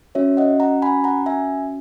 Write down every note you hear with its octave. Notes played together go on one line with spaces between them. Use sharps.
C#4 F#4 C#5 E5
D#5 F#5
F#5 A#5
G#5 B5
F#5 A#5
E5 G#5